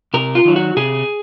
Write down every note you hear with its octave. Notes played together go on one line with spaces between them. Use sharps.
C3 A#4
F4
D#3 F#3
F#4
C3 G#4